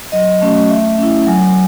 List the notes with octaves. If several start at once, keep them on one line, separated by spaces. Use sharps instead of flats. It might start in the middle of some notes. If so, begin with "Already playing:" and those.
F#3 D#5
A3 C#4 F#4
A3 E5
C#4 E4
F#3 G#5